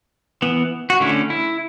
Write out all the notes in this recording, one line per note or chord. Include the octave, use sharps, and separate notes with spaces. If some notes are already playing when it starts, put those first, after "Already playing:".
E3 B3
F#4
D3 A3 C#4 E4
E4